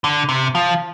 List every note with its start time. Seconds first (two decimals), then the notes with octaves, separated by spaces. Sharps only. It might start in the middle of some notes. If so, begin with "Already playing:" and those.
0.04 D3
0.29 C3
0.55 F3